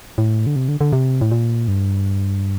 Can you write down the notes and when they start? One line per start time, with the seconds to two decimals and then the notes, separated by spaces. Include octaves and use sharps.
0.18 A2
0.47 D3
0.56 C3
0.68 D3
0.81 D3
0.93 C3
1.21 A2
1.31 A#2
1.68 G2